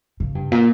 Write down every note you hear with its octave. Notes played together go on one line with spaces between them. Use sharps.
C#3
G2
A#2